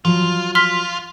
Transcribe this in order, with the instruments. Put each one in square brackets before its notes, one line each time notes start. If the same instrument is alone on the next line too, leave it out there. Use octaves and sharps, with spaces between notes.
[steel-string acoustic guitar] F3 F#3 [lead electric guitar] F4
[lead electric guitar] F4 [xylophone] C6 F6 B6